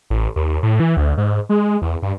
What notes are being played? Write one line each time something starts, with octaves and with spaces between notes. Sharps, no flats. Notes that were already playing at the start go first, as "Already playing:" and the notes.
A1
D#2
A2
E3
D2
G#2
G#3
E2
G2